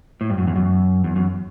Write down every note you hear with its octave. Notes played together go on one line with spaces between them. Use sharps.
A2
G2
F#2
E2
F#2
E2
F#2